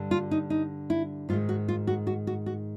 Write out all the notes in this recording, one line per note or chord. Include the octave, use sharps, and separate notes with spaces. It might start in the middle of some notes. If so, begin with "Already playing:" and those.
Already playing: G2 D3 G3
F4
D#4
D#4
E4
G#2 D#3 G#3 F4
F#4
F4
F#4
F#4
F#4
F#4